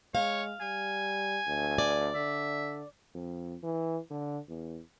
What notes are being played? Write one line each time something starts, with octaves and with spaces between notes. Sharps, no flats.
G#3 C#5 F5
G3 G#5
D2
D5
D3 E5
F2
E3
D3
E2